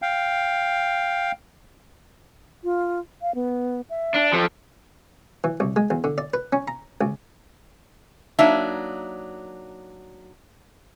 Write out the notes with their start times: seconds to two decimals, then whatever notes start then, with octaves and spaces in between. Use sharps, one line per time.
0.02 F5 G5
2.64 F4
3.22 F5
3.35 B3
3.90 E5
4.14 D4
4.33 F3 A4
5.44 E3
5.60 C2
5.76 G#3
5.90 E2
6.04 D3
6.18 D5
6.34 B4
6.53 C#4
6.68 A#5
7.01 C#2
8.39 F#3 A#3 D4 D#4 E5